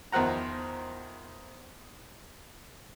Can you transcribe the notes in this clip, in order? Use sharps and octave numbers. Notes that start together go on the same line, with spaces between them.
E2 D#3 F3 F#5 A#5